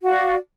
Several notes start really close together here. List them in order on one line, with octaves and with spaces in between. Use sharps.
F#4 F5 D5